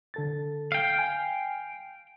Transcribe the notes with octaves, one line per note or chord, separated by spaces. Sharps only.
D3 A4 A6
F5 G5
G#5